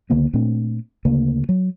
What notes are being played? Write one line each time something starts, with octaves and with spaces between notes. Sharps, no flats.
C#2 D3 A#3 B3
A#2 A3 C4 D4
D2 C#3 A#3
F#3